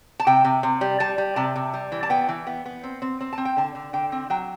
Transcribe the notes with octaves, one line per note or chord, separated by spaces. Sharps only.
A5
C3 G5
C3
C3
G3
G3 A5
G3
C3 A5
C3
G3
E3
A5
B3 G5
E3
B3
B3
C4
C4
C4
A5
C4
G5
D3 A5
D3
D3 G5
C4
F#3 G5